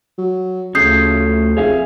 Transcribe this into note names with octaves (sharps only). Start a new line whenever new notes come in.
F#3
D2 C#3 F3 A3 C#4 D#6 G6 C7
F1 G#4 C#5 E5 F5